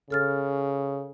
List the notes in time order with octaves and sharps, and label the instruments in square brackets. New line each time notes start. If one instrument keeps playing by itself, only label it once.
[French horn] C#3 [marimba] A4 F6 A6